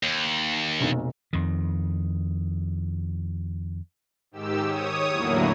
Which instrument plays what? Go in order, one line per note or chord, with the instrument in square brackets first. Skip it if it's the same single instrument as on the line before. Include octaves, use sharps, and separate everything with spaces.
[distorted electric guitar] D#2
[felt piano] F1 B1
[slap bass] F2 D#3
[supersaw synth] G#2 D#3 G4 E6
C#5 D#6
E2 A2 D3 F#3 A#3 E4